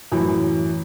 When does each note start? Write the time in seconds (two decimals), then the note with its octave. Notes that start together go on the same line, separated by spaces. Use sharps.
0.12 F#2 A2 E3